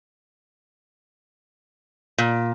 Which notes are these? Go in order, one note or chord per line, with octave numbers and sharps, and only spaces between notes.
A#2